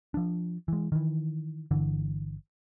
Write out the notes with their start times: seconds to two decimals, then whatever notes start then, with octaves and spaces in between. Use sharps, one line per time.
0.14 F3 D4
0.68 E3 G#3
0.92 D#3 E3
1.71 G1 D3 E3